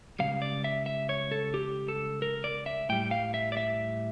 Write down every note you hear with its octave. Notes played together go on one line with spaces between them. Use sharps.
C#2 C#3 G3 F5
D5
E5
E5
C#5
A4
G4
A4
A#4
D5
E5
A2 G3 G5
F5
E5
D5
E5